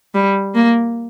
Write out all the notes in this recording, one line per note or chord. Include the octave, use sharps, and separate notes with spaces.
G3
A#3